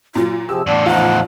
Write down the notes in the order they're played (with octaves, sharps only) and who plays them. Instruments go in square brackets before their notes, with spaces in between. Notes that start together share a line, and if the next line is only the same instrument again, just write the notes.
[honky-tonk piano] A#2 F#3 [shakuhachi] F4
[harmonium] C3 F3 G4 [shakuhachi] G#4 [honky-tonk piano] E6
[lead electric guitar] E2 A2 [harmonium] D4 D5 [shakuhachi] F#5
[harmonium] F3 D#4 [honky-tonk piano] F4 [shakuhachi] F#5